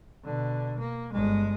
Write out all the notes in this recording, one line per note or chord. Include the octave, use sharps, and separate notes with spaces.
B2 D3
A#3
G1 G#3